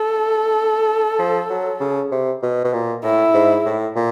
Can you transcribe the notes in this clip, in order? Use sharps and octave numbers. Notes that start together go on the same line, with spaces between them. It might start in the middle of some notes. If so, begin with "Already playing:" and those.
Already playing: A4
F3
F#3
C#3
C3
B2
B2
A#2
A2 E4
G#2
A2
A#2